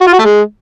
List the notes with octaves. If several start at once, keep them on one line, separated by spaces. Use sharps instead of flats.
F#4
F4
F#4
A3
G#3